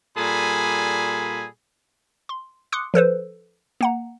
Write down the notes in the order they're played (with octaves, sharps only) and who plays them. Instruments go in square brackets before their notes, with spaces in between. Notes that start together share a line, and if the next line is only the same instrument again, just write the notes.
[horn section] A#2 G3 G#4 A4 G#5 B5
[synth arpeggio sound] C6
C6 D6 D#6 F#6 C#7
F3 A4 B4 C5
A#3 F#5 A#5